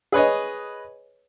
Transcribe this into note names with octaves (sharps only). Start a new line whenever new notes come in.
G#4 B4 C#5 D#5